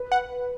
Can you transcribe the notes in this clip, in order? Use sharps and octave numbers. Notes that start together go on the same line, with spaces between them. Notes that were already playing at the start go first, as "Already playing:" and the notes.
Already playing: B4
F#5